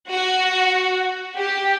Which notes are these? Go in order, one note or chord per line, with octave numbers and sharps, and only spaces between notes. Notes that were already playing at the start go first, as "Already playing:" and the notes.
F#4
G4